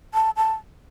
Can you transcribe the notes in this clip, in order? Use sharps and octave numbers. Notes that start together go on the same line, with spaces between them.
A5
A5